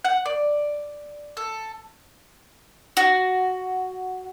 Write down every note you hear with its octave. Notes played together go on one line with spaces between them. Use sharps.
F#5
D5
A4
F#4